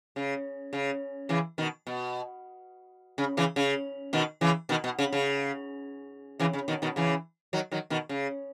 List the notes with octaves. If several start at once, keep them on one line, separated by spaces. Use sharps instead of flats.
C#3
C#3
C#3 E3
B2 D#3
B2
C#3
C#3 E3
C#3
B2 D#3
C#3 E3
B2 D#3
B2
C#3
C#3
C#3 E3
C#3
B2 D#3
B2 D#3
C#3 E3
D#3 F#3
D#3 F#3
B2 D#3
C#3